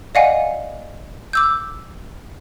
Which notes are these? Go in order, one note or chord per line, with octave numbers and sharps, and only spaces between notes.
D5 D#5 F5 F#5 G#5
D6 E6 G6